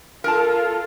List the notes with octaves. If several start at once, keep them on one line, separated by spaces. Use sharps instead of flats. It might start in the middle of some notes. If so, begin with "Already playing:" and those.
F4 A4 A#4 A5